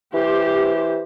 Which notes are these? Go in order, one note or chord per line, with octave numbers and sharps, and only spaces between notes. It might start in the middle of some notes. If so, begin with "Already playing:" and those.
E3 G4 C5